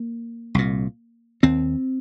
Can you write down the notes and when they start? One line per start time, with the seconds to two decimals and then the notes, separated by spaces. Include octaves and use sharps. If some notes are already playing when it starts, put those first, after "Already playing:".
Already playing: A#3
0.55 C2 A#2
1.43 D#2 C4